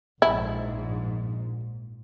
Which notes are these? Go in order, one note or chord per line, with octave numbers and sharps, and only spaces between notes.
A#1 G#2 E4